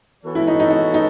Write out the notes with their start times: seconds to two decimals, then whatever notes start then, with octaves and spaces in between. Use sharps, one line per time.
0.23 E3 B3 F#4 A4 C#5
0.35 E4
0.47 D#4
0.60 D#4
0.70 D#4
0.94 D#4